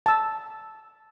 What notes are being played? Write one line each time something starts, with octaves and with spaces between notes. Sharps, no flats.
A5 E6